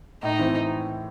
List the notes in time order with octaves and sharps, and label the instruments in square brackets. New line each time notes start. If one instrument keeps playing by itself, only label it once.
[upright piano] A2 [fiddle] D#4
[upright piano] E3 C4 E4